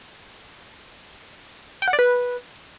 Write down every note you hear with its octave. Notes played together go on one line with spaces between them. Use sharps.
G5
F#5
D5
B4